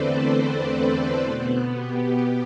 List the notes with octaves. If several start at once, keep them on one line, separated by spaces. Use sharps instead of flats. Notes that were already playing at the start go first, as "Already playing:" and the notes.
Already playing: E2 D3 A3 C4 A4 B4 C5 D5
A4 C5
B2 B3
G4